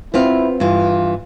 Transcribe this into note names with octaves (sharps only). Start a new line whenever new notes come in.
B3 C4 E4 F4
G2 E3 F4